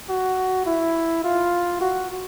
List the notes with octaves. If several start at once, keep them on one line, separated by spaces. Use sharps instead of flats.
F#4
E4
F4
F#4